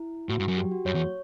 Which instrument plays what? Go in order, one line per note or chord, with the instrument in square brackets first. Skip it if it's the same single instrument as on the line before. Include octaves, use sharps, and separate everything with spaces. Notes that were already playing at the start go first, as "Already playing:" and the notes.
Already playing: [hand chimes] E4
[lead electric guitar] A2 [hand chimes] F#4
[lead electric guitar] G2
F#2
[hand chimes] G4
F#4
[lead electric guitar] F#2 [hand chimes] C#5
[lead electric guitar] E2